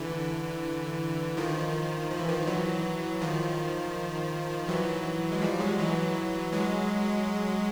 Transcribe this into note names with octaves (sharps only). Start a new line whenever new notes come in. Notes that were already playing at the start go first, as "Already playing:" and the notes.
Already playing: D3 E3
D#3 F3
F3
E3
D#3 F3
E3 F#3
D#3 F3
E3 F#3
G#3
F3 G3
F#3 G#3
E3 F#3
F#3 G#3